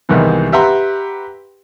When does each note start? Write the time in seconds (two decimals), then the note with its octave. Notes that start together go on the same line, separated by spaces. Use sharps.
0.09 C2 G#2 D#3 E3 B3
0.52 G4 B4 E5 F#5 A#5 C6